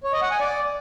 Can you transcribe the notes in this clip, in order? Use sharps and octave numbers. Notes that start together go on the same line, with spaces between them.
C#5
D#5
F#5
G#5
D5